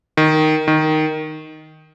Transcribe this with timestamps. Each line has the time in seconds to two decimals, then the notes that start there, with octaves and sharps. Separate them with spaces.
0.17 D#3
0.68 D#3